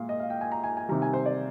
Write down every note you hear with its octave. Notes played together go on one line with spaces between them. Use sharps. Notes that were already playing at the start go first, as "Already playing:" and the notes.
Already playing: A#2 G#3 F5
D#5
F5
G5
G#5
A#5
G#5
G#5
C3 D#3 G3 A#5
G#5
C5
D5